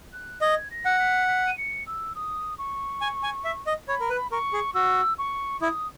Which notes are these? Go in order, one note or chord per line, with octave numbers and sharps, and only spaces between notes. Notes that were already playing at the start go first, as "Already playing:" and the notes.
F#6
D#5 G#6
A#6
F#5
B6
B6
D#7
C#7
E6
D#6
C#6
G#5
G#5
E5
D#5
C#5 B5
A#4
B4
A#4 C#6
G#4
F#4 E6
C#6
E4 D#6